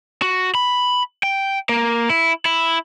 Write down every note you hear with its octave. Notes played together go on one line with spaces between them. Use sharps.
F#4
B5
G5
A#3
E4
E4